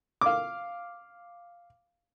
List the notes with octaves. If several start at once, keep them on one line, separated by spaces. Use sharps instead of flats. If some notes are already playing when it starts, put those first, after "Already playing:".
F5 D6